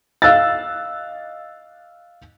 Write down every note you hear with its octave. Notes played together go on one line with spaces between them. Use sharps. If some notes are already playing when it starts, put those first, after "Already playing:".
D#5 F5 E6 F#6 A6